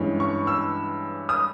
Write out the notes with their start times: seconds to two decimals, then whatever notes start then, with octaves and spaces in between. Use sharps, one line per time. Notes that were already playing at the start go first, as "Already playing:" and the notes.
Already playing: G2 E3 G#3 C#4
0.20 C#6
0.47 E6
1.29 D#6